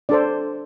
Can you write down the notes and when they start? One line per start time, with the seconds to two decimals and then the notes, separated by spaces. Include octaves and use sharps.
0.09 D4 A4 C5 D5